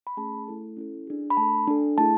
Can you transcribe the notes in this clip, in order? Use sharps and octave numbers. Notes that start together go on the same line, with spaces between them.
B5
A3 C#4 G#4 A5
A3 E4 A4
C#4 E4 A4
D4 G#4
B5
A3 D4 A4 A5
D4 A4
A3 E4 G#4 A5